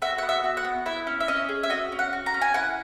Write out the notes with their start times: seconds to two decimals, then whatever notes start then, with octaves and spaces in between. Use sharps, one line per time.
0.02 F#4 E5
0.18 B3 F#5
0.29 E5
0.44 F#4
0.57 F#5
0.65 B3
0.86 E4 E5
1.07 C#4
1.20 E5
1.28 C#4 D#5
1.49 G#4
1.63 E5
1.70 F#4 D#5
1.92 C#4
1.99 F#5
2.13 F#4
2.26 A#5
2.34 C#4
2.41 G#5
2.54 E4 F#5